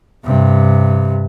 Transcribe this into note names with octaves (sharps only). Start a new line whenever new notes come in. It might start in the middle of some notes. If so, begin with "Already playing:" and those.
G2 C3